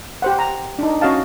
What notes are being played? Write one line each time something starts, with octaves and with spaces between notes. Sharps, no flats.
G4 C5 F#5
A#5
D4 D#4
C#4 F#4 D#5 F5 A5